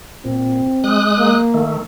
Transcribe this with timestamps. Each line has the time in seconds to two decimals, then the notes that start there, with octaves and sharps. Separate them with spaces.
0.25 A#2 C4
0.84 G#3 D#6 F#6
1.18 A#3
1.54 D#3 A3